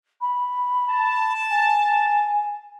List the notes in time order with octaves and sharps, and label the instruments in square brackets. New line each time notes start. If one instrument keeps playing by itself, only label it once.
[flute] B5
[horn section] A5
[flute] G#5